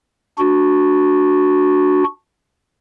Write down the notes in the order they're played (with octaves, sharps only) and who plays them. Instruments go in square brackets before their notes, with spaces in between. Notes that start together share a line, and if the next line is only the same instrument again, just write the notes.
[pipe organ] D4 F#4